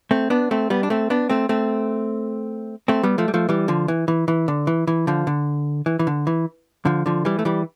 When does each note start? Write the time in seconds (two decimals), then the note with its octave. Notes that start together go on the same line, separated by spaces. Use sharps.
0.11 A3 C4
0.30 B3 D4
0.51 A3 C4
0.70 G3 B3
0.83 D4
0.90 A3 C4
1.10 B3 D4
1.30 A3 C4
1.49 A3 C4
2.88 A3 C4
3.03 G3 B3
3.18 F3 A3
3.28 G3
3.34 F3 A3
3.49 E3 G3
3.68 D3 F3
3.88 E3
4.08 E3
4.28 E3
4.48 D3
4.67 E3
4.87 E3
5.07 D3 F3
5.27 D3
5.86 E3
5.99 E3
6.07 D3
6.27 E3
6.85 D3 F3
7.06 D3 F3
7.25 E3 G3
7.39 A3
7.45 E3 G3